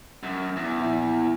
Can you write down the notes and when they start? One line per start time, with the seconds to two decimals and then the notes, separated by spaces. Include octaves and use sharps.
0.23 F#2
0.56 E2
0.80 A#1 E4